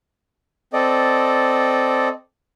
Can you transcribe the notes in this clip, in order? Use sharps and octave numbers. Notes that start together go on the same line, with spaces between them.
C4 A4 D5 D#5